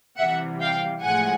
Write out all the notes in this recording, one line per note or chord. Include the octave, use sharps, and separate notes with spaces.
C3 E3 G3 E5 F#5
F5 G5
A2 F3 G#3 F#5 G#5